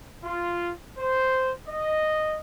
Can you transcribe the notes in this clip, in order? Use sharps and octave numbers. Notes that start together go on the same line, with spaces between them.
F4
C5
D#5